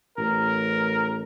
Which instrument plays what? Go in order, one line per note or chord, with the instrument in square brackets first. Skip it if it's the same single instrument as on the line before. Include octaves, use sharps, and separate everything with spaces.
[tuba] A1 [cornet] A#4